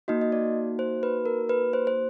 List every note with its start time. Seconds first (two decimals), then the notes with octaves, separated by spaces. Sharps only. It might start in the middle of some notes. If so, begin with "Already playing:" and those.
0.08 A#3 D#4 F#4 D#5
0.21 D#5
0.32 D5
0.79 C5
1.03 B4
1.26 A#4
1.49 B4
1.73 C5
1.87 C5